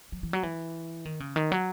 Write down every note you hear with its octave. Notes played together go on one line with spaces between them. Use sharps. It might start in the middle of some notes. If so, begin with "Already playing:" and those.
F#3
E3
F#3
E3
D#3
C#3
D#3
F#3